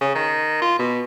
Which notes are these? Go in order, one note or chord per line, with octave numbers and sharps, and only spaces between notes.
C#3
D#3
F4
B2